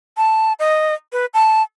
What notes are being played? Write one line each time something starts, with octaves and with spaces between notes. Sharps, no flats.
A5
D#5
B4
A5